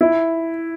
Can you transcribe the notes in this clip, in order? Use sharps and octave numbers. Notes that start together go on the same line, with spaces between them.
E4